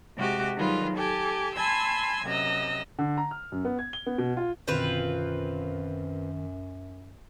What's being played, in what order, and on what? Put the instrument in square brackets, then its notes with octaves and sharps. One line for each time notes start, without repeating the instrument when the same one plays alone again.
[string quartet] C3 G#3 F#4 G4 D6
D#3 F#3 G3 F4 G#4 B4
G4 A4 G#5 D6
G#5 A5 B5 C6 E6 G#6
F#2 C3 D#5 A#5 E6
[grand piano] D3
A#5
F6
F#2
B3
G#6
G7
B3
B2
F4
[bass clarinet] F#2 [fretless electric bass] B2 D3 [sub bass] D#3 [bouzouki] C4 F4 B4